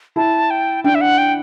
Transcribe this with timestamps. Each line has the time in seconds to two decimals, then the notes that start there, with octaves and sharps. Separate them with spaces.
0.16 E4 A5
0.50 G5
0.84 D4 G5
0.95 E5
1.01 F#5
1.18 G5